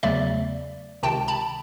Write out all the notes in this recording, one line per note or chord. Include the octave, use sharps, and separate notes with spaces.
E2 C#3 F#3 A3 D5 E5
C#2 C3 D#3 G5 A5
A5 B5